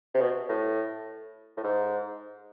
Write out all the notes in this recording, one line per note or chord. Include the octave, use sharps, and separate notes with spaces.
C3
B2
A2
A2
G#2